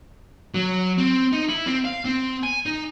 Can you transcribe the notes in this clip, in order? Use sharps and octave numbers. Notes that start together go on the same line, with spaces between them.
F#3
C4
D#4
E4
C4
F5
C4
G#5
D#4